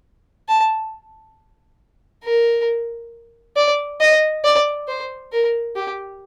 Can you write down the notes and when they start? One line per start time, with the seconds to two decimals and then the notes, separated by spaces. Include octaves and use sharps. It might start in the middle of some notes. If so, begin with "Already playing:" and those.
0.48 A5
2.24 A#4
3.56 D5
4.01 D#5
4.44 D5
4.88 C5
5.32 A#4
5.76 G4